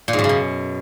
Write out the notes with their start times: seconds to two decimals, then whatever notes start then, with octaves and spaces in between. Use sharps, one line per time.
0.08 A#2
0.13 G#2
0.19 F#2
0.24 C#3
0.29 B2